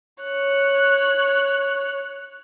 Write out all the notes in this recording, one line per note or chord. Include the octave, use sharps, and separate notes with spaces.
C#5 F#6